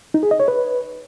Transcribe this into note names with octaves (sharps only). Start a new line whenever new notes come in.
D#4
G#4
D#5
C#5
B4